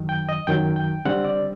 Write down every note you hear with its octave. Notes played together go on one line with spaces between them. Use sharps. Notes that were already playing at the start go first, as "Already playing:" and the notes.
Already playing: F#2 D#3 F#3
G5
D#5
F#2 D#3 F#3 G5
G5
D3 G3 C4 F#5
D5